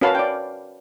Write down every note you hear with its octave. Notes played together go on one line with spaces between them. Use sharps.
C#4 F#4 A#4 B4 F5 A5
D5 G5